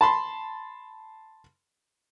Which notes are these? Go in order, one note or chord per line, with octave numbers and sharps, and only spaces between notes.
A5 B5 C6